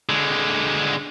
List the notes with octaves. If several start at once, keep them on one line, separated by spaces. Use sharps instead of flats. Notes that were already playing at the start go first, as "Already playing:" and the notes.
D3 G#3